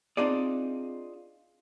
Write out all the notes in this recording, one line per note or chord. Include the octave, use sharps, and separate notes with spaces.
C4 D4 D#4 F4 G#4 D5